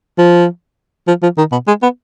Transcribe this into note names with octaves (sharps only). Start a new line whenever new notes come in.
F3
F3
F3
D#3
B2
G#3
B3